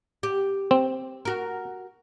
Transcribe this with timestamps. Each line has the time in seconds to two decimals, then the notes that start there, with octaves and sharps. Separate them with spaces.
0.23 G4
0.71 C4
1.25 F#4 A#4